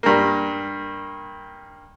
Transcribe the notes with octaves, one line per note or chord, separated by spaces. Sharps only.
G2 A#3